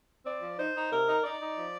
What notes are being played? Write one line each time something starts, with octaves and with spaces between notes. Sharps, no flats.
C4 D5
F3
D#4 C5
D#4
C3 A#4
D#4
D#4 D5
D#4
F3